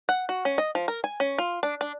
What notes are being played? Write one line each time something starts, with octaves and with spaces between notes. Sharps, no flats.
F#5
F#4
C#4
D#5
F3
A#4
G#5
C#4
F4
D4
D4